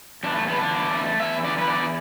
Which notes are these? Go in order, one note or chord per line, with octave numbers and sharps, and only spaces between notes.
E2 D4
A3
D3 B3
D4
E2
A3
E2 E5
D3 D5
B4
E2 D5